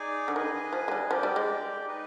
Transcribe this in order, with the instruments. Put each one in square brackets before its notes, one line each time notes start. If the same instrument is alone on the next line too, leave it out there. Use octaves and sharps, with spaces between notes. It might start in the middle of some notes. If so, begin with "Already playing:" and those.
Already playing: [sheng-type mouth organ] D#4 G#4 D5 G#5
[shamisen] D3
[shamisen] D#3 [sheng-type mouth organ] G#4 B4 D#5 G#5
[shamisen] F3
G#3
G3
[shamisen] F3 [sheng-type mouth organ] G4 D5 G5
[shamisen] G3
G#3
[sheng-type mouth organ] D#4 B4 D#5